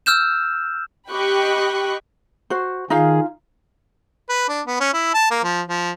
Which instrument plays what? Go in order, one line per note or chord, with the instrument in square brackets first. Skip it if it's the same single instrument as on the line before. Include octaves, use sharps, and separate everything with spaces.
[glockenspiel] E6 F6 G6 E7
[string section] G4 D#5 G5 B5 C#6 F#6
[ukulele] F#4 C5
[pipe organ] D#3 G#4 [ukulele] D#4 F4 F5
[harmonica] B4
D4
B3
C#4
E4
A5
A#3
F3
F3